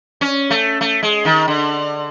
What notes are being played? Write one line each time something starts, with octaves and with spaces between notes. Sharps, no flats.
C#4
A3
A3
G#3
D#3
D3